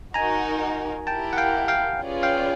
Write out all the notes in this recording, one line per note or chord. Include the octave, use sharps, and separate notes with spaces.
D#4 F#4 A#4 G#5 A#5
E4 G4 A#4 G5 A5
F#5
F5 G5
F5 G5
C#4 F4 G#4 B4 D5
F5 G5